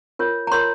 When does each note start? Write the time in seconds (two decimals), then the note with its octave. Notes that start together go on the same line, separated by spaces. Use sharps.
0.19 F4 A#4 C#5
0.47 A#5
0.52 F4 A#4 C#5 C6